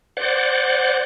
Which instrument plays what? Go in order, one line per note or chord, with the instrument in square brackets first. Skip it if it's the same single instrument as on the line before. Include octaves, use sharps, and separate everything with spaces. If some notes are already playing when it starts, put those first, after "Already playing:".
[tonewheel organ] C5 D5 F#5